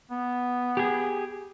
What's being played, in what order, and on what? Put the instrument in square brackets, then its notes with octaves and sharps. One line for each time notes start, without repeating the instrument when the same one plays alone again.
[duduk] B3
[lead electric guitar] G4 G#4